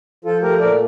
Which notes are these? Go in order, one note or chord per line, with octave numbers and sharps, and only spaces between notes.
F3 F4 A4
A3 G4 A#4
A#2 A#4 D5